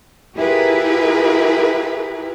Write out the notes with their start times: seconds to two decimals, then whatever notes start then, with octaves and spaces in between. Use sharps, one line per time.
0.36 E4 F4 G4 G#4 A#4 B4